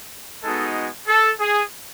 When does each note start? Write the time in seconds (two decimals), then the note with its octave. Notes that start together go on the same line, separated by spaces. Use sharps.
0.43 G#3 B3 D#4 F#4 A4
1.08 A4
1.39 G#4